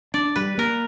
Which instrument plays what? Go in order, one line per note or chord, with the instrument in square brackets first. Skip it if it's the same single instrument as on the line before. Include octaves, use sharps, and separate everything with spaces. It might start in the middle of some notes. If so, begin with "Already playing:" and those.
[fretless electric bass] D4 [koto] D5
[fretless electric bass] G3 [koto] B4
[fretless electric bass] A#3 [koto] A#4